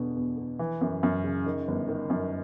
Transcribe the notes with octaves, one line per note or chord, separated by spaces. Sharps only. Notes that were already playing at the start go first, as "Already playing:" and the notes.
Already playing: E2 B2 D3
E2
E2
E3
F#2
F#2
C#3
D#3
G1
D#3
F#2